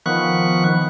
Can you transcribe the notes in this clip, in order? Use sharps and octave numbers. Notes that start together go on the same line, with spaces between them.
D#3 F3 B3 C#6 F#6